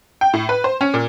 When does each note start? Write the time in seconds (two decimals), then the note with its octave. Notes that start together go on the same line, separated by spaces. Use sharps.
0.21 G5
0.33 A2
0.49 B4
0.64 C5
0.81 C#4
0.94 A#2